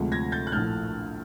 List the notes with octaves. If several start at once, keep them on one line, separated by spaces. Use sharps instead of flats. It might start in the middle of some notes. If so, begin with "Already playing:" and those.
Already playing: D2 C3 F3 G#3
G#6 A#6
G6 A6
F#6
A#1 A2 F3 A3 F6 G6